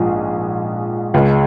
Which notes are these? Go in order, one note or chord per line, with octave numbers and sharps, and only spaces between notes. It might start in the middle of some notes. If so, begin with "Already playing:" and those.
Already playing: A#1 G#2 F3 G#3 G#4
C#2 C#3 G#3